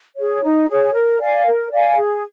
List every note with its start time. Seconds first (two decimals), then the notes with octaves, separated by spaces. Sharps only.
0.17 G#4 C#5
0.43 D#4
0.69 G#4 C#5
0.93 A#4
1.20 D5 F5 G#5
1.46 A#4
1.71 D5 F5 G#5
1.97 G#4